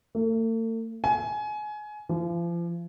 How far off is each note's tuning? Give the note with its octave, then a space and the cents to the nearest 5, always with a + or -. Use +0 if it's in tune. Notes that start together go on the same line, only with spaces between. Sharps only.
A3 +45
G#5 +25
F3 -35